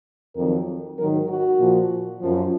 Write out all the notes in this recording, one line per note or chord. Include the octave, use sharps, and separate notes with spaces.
F2 D#3 F#3 A#4
G#2 D#3 F#3 A#4
F#4
A#2 F3
F#2 F3